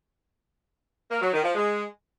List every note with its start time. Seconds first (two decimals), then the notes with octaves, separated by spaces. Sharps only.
1.10 A#3
1.21 F#3
1.33 D#3
1.44 F3
1.55 G#3